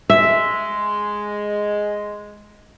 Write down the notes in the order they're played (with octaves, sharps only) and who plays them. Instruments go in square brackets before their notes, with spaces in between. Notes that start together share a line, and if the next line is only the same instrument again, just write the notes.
[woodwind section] G#3 [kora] E5